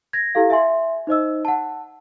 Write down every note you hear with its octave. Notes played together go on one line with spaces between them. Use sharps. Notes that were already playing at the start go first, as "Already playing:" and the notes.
G#6 A#6
E4 G4 A4 F5
E5 G#5 C6
D#4 C5 D#5 E6
F#5 A5